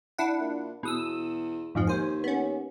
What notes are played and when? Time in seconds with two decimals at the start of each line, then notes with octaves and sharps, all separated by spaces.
0.18 D4 E4 F#5
0.40 A#2
0.83 E2 B2 D#6 E6
1.75 F2 G#2 F3
1.87 D#2 C5 G#5
2.24 B3 C#4